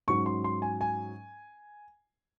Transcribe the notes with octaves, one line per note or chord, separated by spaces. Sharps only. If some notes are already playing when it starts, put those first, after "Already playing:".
G#2 F#3 C#4 C#6
C6
C6
G#5
G#5